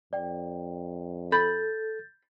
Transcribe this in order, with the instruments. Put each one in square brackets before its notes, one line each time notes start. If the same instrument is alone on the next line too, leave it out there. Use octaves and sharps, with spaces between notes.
[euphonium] F2 [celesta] D5 G5
[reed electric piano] A4 [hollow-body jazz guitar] B5 [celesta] G6 A6